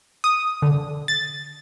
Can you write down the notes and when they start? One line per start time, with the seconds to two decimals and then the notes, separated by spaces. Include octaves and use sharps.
0.24 D#6
0.62 D3
1.08 A6